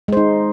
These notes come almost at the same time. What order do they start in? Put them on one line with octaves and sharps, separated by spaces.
G#3 C5 D#4